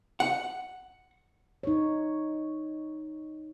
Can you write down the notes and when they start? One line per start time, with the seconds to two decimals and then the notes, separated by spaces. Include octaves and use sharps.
0.20 F#5
1.63 D#4 C#5